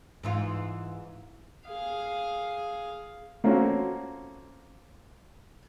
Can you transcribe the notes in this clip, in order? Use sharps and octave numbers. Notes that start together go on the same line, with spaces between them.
G#2 E3 F4
G#4 F5
A3 A#3 C4 C#4 F4 F#4